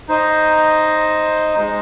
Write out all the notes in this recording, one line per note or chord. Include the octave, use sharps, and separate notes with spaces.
D#4 C5 D#5
G#3 D#4 C5 D#5